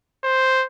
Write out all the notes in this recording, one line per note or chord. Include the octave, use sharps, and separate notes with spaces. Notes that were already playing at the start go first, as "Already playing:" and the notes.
C5